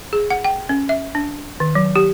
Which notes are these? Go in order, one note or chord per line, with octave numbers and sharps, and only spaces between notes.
G#4
F#5
G5
C#4
E5
D4
D#3
F#3
G4